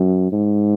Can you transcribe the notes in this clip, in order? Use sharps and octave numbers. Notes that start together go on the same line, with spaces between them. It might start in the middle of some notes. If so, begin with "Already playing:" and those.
Already playing: F#2
G#2